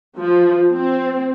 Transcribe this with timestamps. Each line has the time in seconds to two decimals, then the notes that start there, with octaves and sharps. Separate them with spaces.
0.17 F3
0.73 C4